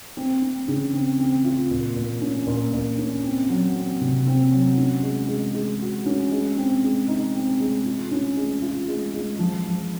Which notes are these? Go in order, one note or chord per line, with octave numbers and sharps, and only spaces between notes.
C4
C4
C#3
C4
C4
F4
A#2
A#2
C#4
A#2
A#2
C#4
C4
F#3
C4
C3
C4
F#3
C#4
G#3
G#3
G#3
F#4
C#4
G#3
C4
G#3
D#4
C4
G#3
F4
C#4
G#3
F4
G#3
G#3
F3
F3